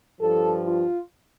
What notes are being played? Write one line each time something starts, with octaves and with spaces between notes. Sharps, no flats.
G2 F3 A4
F4